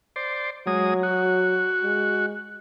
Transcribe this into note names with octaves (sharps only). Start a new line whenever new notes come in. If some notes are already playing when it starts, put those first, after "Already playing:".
C5 D5
F#3 G#3 D#6
F#4
G#3